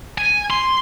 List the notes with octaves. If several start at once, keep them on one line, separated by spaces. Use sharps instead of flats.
G#5
C6